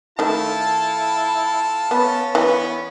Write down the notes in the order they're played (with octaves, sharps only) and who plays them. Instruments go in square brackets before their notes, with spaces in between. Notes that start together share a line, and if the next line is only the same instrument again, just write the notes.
[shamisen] D#3 A3 [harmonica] E4 [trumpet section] F4 A4 A5
[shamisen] B3 [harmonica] C#4 B5
[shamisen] E3 [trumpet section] B3